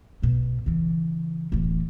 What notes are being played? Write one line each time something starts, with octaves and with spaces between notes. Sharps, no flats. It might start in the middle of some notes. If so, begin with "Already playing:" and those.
B1 B2
C#3 E3
D1 E3